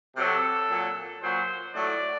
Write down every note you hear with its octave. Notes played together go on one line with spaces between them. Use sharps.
C3 F#3 A4
A#2 F#3
A#2 F#3 C5
A2 F#3 D5